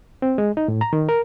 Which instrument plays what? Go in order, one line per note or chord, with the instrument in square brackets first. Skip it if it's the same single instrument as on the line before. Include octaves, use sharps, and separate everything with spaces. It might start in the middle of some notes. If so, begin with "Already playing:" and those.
[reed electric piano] C4
G#3
D#4
A2
A#5
D#3
A#4